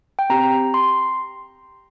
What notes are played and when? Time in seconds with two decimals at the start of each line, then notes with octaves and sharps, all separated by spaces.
0.19 G5
0.30 C4 G4 A#5
0.74 C6